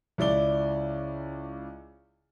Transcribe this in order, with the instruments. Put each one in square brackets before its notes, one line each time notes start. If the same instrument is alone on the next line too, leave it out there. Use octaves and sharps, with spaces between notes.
[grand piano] C#2 E4 D5 G7